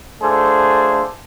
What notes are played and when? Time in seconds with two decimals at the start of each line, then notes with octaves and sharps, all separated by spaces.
0.22 A3 D4 F4 G#4 A4 C5